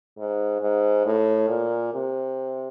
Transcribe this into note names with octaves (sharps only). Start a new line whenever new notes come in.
G#2
G#2
A2
A#2
C3